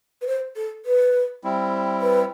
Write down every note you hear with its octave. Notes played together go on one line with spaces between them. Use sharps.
B4
C5
A4
B4
G3 C4 E4
B4